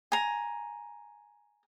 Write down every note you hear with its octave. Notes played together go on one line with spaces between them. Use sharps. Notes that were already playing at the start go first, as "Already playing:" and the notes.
G#5 A#5